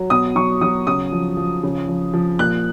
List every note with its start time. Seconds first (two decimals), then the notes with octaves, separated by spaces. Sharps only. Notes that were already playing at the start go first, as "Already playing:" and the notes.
Already playing: F#3
0.10 B2 D#6
0.36 F#3 C#6
0.61 F#3 D#6
0.87 C#3 D#6
1.12 F3
1.37 F3
1.63 C#3
1.88 F3
2.14 F3
2.39 A#2 F#6